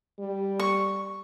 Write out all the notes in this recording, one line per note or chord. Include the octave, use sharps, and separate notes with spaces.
G3
C#6